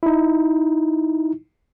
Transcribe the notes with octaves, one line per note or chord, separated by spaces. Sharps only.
D#4 E4